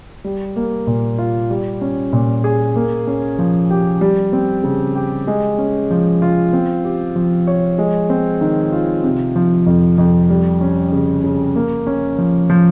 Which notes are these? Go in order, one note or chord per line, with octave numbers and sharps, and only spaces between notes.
G3
A#3
A#2
F4
G3
C#4
A#2
G#4
A#3
C#4
F3
G4
G3
C4
C#3
G4
G#3
C#4
F3
F4
C4
G4
F3
C#5
G#3
C4
D#3
F4
C3
F3
F2
F2
G3
C#4
C#3
C#3
A#3
C#4
F3
F3